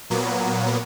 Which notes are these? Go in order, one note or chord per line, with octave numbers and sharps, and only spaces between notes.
A#2 F#3 A#3 B3